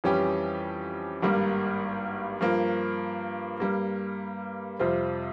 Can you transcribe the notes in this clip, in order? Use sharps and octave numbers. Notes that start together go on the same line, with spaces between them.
F2 E3 G3 C#4 G4
G#1 G2 G3 A#3
G2 F3 A#3
G2 G3 A#3
F2 C3 G3 C4 F4